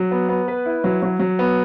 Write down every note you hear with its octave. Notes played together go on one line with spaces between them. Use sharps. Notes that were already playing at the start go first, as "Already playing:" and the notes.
Already playing: F#3
B3
B3
B4
E4
F#3
F#3
F#3
B3